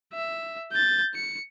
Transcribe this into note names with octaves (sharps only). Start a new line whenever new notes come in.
E5
G6 A6
C#7